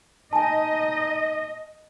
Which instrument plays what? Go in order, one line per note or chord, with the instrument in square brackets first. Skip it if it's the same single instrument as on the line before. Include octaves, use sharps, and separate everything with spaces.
[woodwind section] D#4 [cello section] D#5 [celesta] G#5 A5